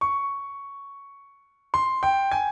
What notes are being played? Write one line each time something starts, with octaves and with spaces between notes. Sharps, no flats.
C#6
C6
G5
G#5